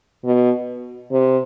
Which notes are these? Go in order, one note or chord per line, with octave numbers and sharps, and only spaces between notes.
B2
C3